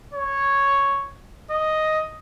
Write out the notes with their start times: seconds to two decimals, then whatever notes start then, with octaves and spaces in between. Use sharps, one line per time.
0.14 C#5
1.51 D#5